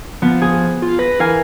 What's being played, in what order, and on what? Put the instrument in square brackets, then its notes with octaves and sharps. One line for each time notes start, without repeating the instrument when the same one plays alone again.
[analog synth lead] F3 [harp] B3
[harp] G#4
[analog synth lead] F4
[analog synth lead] B4 [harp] A#6
[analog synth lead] E3 [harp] A#4 F5 G#5